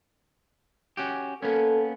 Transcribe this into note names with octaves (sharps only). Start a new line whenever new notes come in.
C#4 F#4 G4
A#3 B3 C#4 A4